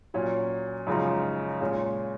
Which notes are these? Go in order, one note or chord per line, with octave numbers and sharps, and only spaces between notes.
A#2 F#3 C#4
F#2 C#3 F3 G#3 D#4
A#2 G#3 C#4